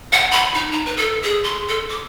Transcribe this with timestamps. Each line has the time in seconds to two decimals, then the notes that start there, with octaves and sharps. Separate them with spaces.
0.13 F#5
0.31 B5
0.54 D#4
0.72 A#5
0.86 B4
0.97 A4
1.23 G#4
1.44 C6
1.68 A4
1.89 D6